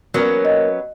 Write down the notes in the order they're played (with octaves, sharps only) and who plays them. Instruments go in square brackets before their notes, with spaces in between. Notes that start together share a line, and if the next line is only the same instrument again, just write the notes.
[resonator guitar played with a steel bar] F#3 B3 C#4 [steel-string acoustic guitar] A#3
[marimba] D#5